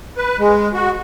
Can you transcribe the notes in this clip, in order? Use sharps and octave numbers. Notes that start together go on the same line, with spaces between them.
B4
G#3
F#4